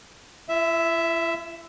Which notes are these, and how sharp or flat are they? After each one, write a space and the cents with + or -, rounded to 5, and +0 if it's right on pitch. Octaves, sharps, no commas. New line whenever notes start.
E4 +45 E5 +0